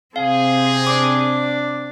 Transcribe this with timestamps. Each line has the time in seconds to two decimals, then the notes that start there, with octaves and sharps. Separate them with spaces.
0.16 C3 C4 G#4 F5
0.87 D4 D6